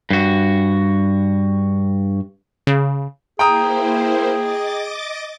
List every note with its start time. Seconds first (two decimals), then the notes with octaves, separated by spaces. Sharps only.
0.10 G2 F#4
2.67 C#3
3.39 A#3 E4 G#4 C5 G5 A#5 D#6
4.36 D#5 D6 A6